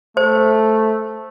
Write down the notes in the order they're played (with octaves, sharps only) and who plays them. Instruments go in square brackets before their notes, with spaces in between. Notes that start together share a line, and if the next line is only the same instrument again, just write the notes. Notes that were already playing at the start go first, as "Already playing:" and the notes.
[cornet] A3 [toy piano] C5